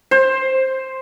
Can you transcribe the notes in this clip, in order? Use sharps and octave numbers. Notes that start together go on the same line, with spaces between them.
C5